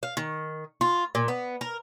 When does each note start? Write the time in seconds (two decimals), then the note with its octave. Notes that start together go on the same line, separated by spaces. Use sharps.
0.03 F5
0.17 D#3
0.81 F4
1.15 A#2
1.28 B3
1.61 A#4